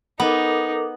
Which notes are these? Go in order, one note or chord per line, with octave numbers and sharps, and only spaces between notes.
B3 D#4 A4 A#4 D6